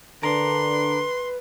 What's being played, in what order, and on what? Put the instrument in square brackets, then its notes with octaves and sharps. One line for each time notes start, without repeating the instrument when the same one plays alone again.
[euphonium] D3 [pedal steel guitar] D4 A#4 [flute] B4 [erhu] C6